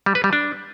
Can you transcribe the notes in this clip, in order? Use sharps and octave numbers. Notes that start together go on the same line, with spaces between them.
G3
B4
G3
D4